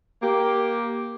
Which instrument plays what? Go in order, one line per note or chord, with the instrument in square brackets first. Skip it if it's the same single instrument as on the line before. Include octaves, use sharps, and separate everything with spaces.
[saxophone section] A#3 G4